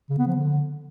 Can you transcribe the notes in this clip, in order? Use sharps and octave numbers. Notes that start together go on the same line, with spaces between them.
C#3
B3
F3
D3